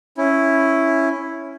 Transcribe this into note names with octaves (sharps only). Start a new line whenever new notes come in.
C#4 E4